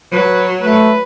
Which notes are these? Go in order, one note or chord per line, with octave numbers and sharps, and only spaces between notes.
F#3 B4
A3 B4